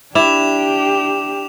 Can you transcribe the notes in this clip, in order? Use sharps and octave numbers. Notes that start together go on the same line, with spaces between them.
D4 E4 G4 D6 E7